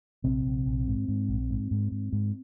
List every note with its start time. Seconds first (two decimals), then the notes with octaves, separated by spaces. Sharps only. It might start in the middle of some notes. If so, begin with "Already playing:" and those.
0.24 A#1 C3 C4
0.45 A#1
0.66 A#1
0.88 G#2
1.08 G#2
1.28 A#1
1.50 G#2
1.71 G#2
1.92 G#2
2.13 G#2